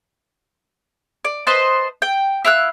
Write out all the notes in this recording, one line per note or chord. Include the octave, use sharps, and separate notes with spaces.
D5
B4 C5 D#5 A5
G5
E4 F5 E6 F#6